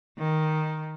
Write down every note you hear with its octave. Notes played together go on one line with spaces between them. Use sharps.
D#3